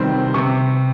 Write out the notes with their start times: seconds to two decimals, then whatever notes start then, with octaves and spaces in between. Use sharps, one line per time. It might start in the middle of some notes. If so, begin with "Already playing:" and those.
Already playing: C3 D#3 G3 C4 C6
0.34 C3 C#6